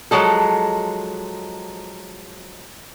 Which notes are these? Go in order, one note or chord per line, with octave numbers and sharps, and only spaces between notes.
F3 F#3 G#3 A4